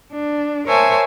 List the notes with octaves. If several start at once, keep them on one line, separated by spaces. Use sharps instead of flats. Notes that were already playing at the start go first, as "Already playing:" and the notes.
D4
A#4 C5 C#5 E5 G#5 A5